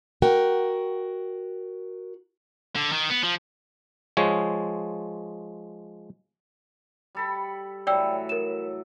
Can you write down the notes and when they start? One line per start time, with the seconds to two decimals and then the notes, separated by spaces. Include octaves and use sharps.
0.22 F#4 A#4 G5
2.76 D3
2.93 D#3
3.10 B3
3.23 F3
4.17 F3 G#3 C#5
7.15 G3 A4 B5
7.87 A2 E3 F#3 D5 G5 E6
8.29 A#4 E7